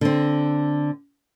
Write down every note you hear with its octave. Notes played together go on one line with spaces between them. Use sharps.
D3 C4